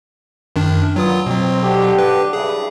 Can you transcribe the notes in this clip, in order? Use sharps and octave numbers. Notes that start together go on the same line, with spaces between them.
F#2 D#3 D4
A#2 F#3 B3 F4 D#6
B2 F#3 C4
D3 G4
B4
G2 C#3 E4 G#4